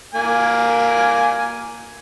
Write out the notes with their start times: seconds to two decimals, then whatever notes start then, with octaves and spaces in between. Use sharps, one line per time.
0.15 A#3 G#5